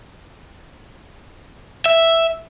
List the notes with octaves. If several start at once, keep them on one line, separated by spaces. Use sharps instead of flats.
E5